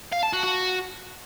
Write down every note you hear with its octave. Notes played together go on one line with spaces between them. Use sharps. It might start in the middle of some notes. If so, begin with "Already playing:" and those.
F5
A5
F#4
F#4